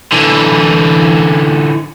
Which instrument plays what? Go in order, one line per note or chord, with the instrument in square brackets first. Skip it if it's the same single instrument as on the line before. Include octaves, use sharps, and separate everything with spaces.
[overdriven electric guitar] D3 E3